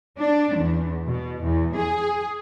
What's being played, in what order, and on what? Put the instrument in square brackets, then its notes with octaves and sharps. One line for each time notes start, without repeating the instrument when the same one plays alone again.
[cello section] D4
E2
B2
E2
G#4